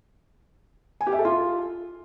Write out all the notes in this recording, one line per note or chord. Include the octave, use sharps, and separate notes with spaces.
G#5
G4
E5
A4
F4